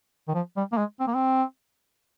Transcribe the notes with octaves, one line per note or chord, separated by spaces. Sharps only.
D#3
F3
G3
A#3
G#3
C4
A#3
C4